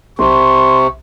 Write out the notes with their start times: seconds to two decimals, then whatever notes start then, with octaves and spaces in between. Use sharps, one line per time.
0.19 B1 C3 C6 C#6